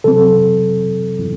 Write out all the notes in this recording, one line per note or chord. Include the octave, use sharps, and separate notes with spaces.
C3 F#3 C4 A4